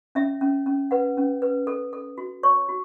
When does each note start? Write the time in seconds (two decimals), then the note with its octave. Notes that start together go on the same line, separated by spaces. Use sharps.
0.15 C#4 E5
0.41 C#4
0.66 C#4
0.91 B4 F#5
1.17 C#4
1.42 B4
1.67 A4
1.93 A4
2.18 F#4
2.43 C#5 C#6
2.68 F#4